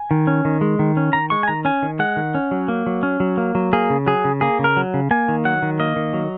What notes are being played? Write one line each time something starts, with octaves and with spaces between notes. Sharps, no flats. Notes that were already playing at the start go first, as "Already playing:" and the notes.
Already playing: G#5
D#3
C#4
D#3
G#3
D#3
C#4
D#3 A#5
G#3 C#6
G#5
D#3 A#5
C#4 G#5
D#3
G#3 F#5
D#3
C#4
F#3
A#3
F#3
C#4
F#3
A#3
F#3
A#3 G#4
C#3
F#3 G#4
C#3
A#3 G#4
C#3
A#4
F#3
C#3
A#3 G#5
D#3
F#3 F#5
D#3
A#3 D#5
D#3
F#3